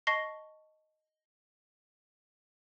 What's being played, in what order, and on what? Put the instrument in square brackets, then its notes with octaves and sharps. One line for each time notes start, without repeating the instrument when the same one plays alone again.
[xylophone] D#5 A5 C#6 A#6 C7 G7